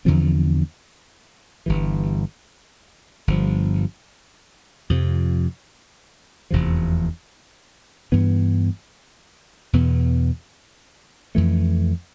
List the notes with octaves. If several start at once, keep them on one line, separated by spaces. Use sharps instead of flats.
E2 D3 F3 C4
G1 G2 E3
G1 G2 F3
F2 C3 F3
F1 E2 C3 F3
G2 E3 B3
E2 B2 B3
F2 E3 A3